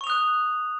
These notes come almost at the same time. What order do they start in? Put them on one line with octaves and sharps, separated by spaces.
C#6 F7 D#6 F#6